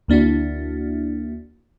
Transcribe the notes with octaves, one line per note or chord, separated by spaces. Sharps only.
D2 A#3 D4 E4 F#4